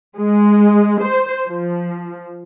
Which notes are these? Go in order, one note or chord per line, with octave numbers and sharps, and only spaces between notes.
G#3
C5
F3